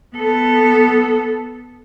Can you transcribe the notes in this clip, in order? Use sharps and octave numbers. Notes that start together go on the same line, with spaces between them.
B3 A4